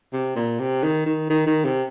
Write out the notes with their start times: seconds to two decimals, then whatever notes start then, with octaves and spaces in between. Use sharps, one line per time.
0.13 C3
0.36 A#2
0.59 C3
0.83 D#3
1.06 D#3
1.30 D#3
1.47 D#3
1.65 C3